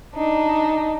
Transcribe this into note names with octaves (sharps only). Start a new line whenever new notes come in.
D4 D#4